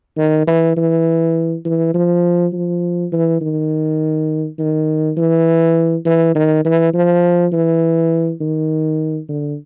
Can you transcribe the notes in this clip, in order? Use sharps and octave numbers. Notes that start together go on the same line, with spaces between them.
D#3
E3
E3
E3
F3
F3
E3
D#3
D#3
E3
E3
D#3
E3
F3
E3
D#3
D3